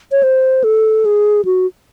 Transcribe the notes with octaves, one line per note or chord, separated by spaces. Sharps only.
C#5
C5
A4
G#4
F#4